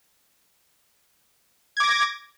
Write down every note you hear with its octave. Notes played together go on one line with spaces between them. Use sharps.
D6 G#6 A#6